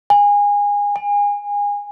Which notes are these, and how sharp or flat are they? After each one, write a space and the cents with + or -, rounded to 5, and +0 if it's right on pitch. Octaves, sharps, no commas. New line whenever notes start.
G#5 -25
G#5 -30